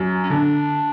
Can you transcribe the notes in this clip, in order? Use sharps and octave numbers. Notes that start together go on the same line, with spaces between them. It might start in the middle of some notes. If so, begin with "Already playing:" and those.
Already playing: F#2
C#4
D3 D4